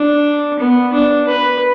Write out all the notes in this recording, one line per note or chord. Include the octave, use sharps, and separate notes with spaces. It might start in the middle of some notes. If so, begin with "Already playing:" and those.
Already playing: D4
B3
D4
B4